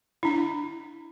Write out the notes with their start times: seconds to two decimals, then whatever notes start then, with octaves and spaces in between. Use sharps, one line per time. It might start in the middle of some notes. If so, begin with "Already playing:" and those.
0.23 D4 E4